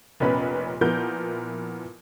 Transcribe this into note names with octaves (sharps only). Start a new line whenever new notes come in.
F1 A#2 B3 C#4 B4 B5
A#2 F3 B3 E4 A#4 G6